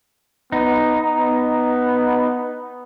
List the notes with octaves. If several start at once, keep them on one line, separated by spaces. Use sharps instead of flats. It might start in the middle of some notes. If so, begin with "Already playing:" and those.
B3 D#4
B3